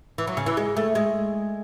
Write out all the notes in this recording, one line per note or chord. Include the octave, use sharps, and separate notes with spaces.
E3
F#3
C#3
E3
G#3
A3
G#3